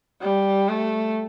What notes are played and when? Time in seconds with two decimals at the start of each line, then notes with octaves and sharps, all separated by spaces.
0.22 G3
0.68 A3